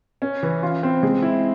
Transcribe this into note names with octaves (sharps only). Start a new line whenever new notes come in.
C#4
E3
F4
C4
G#3
E4